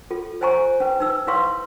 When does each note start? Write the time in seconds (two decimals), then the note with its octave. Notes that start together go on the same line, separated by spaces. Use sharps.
0.11 F4 A4
0.41 C5 C#5 G#5 A#5 C#6
0.80 C#4 B4
1.00 D#4 B4 E6
1.27 E4 B4 C#5 F5 C6 C#6